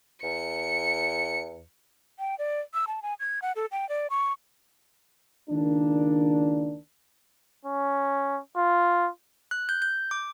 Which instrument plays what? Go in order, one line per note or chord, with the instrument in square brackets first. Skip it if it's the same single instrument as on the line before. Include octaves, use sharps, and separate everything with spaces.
[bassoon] E2 [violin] C#7
[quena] G5
D5
E6
A5
G#5
G#6
F#5
A4
G5
D5
C#6
[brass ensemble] C#2 D#3 A#3 D4
[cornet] C#4
F4
[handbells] F#6
G6
G6
D6